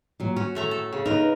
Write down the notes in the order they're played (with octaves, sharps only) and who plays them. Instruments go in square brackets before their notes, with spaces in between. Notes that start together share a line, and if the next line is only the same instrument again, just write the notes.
[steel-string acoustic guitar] A#2 F#3
[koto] C#4 [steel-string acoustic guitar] F#4
[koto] A2 A3 A#5
A4
C#3
[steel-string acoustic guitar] D#4 B4 [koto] A#4